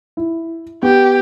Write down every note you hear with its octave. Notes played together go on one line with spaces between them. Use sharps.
E4
B3 G4